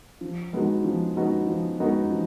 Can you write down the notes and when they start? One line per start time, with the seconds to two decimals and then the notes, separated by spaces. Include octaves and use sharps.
0.21 F3
0.53 G#3 B3 D#4 F#4
0.84 F3
1.16 G#3 B3 D#4 F#4
1.47 F3
1.79 G#3 B3 D#4 F#4
2.11 F3